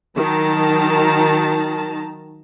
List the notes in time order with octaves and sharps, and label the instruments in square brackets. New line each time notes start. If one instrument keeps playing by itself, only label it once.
[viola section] D#3 F#3 D#4 A5 A#5